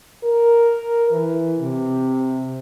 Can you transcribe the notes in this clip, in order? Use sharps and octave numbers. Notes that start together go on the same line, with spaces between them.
A#4
E3
C3